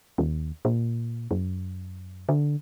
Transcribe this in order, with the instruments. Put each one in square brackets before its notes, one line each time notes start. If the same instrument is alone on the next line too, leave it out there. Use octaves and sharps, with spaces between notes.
[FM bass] D#2
A#2
F#2
D3